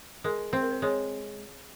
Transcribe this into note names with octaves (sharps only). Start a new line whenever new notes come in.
G#3 A#4
C4 C5
A#4
C5
G#3 C#5